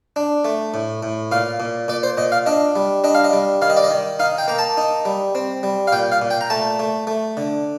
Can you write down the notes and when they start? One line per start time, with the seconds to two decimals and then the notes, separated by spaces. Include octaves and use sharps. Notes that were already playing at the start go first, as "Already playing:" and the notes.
0.16 D4
0.45 A3
0.74 A2
1.03 A2
1.31 A#2 F5
1.60 A#2
1.88 A#2 D5
2.03 C5
2.17 A#2 D#5
2.32 F5
2.46 D4 D#5
2.76 G3
3.04 D4 D#5
3.15 F5
3.24 D#5
3.33 G3
3.62 D#3 F5
3.70 D#5
3.77 D5
3.84 D#5
3.91 D#3
4.20 D#4 F5
4.38 G5
4.48 A#3 A#5
4.59 A5
4.77 D#4
5.05 G3
5.35 C4
5.63 G3
5.87 F5
5.92 A#2 G5
6.12 F5
6.22 A#2
6.31 G5
6.41 A#5
6.50 A3 A5
6.79 A3
7.07 A3
7.37 D3